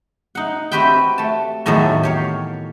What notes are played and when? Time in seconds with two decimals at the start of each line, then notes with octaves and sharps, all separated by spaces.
0.35 D#4 F#5
0.72 C4 F#4 G4 B4 E5 G5
1.18 A3 A5
1.66 E2 A2 D#3 F#3 D5 E5
2.03 G4 C#5 F5